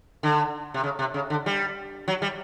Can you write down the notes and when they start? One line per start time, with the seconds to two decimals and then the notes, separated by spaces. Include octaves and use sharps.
0.23 D3
0.74 C3
0.83 C#3
0.99 C3
1.14 C#3
1.30 D3
1.46 G3
2.08 F#3
2.22 G3